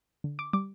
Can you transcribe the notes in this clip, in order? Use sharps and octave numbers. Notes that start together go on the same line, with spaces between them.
D3
D6
G3 D6